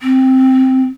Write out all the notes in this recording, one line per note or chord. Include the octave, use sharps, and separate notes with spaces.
C4